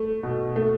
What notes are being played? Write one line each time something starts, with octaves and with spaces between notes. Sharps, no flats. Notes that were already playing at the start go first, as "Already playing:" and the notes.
Already playing: A3
B2
A3